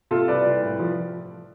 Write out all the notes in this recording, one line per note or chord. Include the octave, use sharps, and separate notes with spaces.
C3 F4 A4
C2 B4 D5
C2
A2
F3